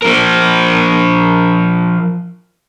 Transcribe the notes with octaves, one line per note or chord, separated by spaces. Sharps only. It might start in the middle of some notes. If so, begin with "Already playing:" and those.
F3 A#4